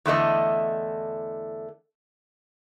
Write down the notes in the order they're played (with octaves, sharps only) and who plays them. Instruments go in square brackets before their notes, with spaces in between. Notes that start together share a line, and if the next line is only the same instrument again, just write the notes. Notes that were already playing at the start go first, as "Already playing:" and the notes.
[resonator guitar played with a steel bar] E2 D3 A3 D#5